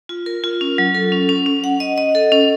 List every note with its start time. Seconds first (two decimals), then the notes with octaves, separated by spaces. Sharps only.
0.09 F4
0.26 A#4
0.44 F4
0.61 C#4
0.78 F#3
0.95 A4
1.12 C#4
1.29 C#4
1.46 C#4
1.64 F#5
1.80 D#5
1.98 D#5
2.15 A4
2.32 C#4